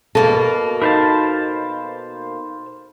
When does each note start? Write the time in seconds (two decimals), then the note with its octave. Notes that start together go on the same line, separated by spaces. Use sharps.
0.15 B2 A#3 A4 A5
0.82 D#4 A#4 C5 F5 A5 B5